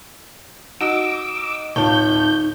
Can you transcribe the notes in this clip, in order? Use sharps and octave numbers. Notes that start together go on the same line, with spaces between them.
D#4 F#4 D6 E6
D1 D#4 F4 C#5 A5 G6